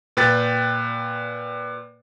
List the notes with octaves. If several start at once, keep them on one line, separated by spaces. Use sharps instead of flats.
A#2 B4 G5 A6